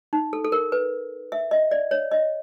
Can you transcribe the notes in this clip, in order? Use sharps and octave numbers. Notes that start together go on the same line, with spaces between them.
D#4
A4
A4
A#4
B4
E5
D#5
D5
C#5
D#5